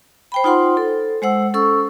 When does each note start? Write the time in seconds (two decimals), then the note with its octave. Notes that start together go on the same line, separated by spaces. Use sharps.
0.32 C5 G5 B5
0.44 D#4 F4 C5 F#5 C6
0.77 A4
1.22 G#3 C5 F#5 E6
1.54 C#4 A4 C#6 E6